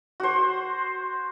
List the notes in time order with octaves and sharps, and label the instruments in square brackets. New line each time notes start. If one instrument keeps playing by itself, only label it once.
[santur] F#4 C5